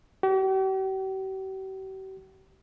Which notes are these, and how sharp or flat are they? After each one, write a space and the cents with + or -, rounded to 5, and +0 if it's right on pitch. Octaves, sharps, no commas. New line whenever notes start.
G4 -45